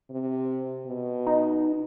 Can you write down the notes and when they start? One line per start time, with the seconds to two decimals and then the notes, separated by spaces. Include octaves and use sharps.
0.10 C3
0.86 B2
1.27 D#4